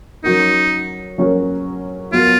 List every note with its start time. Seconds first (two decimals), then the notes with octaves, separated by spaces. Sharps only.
0.24 F#3 C#4 D#4 F#4 A#4
1.18 F#3 C#4 F#4 A#4
2.12 F#3 B3 F4 F#4 A#4